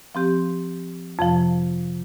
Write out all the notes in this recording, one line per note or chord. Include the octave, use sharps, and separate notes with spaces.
F3 C4 G4
F2 C3 F3